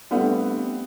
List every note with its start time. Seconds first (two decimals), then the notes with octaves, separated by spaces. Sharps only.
0.11 G3 A3 B3 C4 D4 F#5